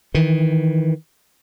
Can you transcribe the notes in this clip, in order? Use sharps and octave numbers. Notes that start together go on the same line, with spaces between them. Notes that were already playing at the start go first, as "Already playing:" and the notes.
D#3 E3